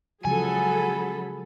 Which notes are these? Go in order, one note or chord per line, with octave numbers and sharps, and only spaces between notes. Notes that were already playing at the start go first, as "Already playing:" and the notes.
C#3 F3 F#3 G#3 G#4 A4 G#5 B5